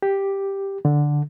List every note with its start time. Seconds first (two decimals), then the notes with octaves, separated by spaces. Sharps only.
0.02 G4
0.85 D3